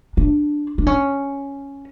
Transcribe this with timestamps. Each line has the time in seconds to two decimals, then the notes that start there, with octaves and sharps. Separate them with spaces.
0.17 D4
0.78 D4
0.87 C#4